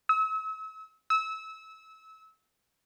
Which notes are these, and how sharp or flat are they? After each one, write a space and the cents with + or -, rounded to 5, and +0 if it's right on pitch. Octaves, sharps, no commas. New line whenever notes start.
E6 -40
E6 -25